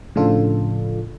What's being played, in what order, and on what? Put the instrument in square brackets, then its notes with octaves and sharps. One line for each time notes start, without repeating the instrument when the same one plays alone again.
[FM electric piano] A2 C#3 F3 D4 F4 A4